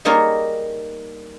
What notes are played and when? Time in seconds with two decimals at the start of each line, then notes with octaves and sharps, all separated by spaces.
0.05 G3 A#3 D#4 G#4 A#4 C#5